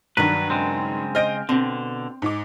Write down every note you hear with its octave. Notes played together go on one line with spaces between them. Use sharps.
G2 D#3 F#3 D4 B4
C#3 G#3 C4
C5 D#5 F6 G6 D7
B2 D3 C4
G#2 D#4 D6